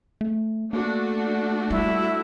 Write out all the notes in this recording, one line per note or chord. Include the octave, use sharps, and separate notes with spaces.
A3
A3 A#3 D4 F#4
G3 E4